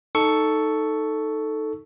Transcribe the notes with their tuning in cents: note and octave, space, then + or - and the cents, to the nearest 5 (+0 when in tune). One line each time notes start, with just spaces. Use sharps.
D#4 +0 A4 +0 C#6 +5